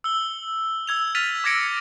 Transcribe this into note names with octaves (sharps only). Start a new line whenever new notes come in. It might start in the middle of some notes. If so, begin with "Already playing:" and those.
E6 G7
E6 G#6 F7
F6 A6 B6 D#7 F7
D6 E6 G#6 A#6 C#7 D7